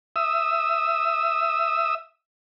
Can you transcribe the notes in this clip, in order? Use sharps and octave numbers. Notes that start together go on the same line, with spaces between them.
E5 D#6 E6